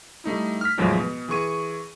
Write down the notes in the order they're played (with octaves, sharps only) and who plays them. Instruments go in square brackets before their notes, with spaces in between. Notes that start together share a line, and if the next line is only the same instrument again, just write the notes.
[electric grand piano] G3 A3 D#4 E4
F6 B6
E2 A2 D#3 F3 F#3 G#3
B2
E3 G#4 C#6 D#7